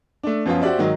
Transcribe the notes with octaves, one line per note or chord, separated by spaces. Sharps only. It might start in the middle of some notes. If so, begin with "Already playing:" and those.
A3 D4
F#2 F3 B3 C#4 F4
F#4 G4 C5 D5 E5
G#2 D#3 F#3 D#4